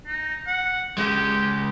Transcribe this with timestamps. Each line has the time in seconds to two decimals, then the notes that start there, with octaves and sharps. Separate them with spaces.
0.07 D#4
0.47 F#5
0.99 C#2 G#3 G4